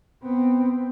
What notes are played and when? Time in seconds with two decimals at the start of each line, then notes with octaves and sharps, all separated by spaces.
0.23 B3 C4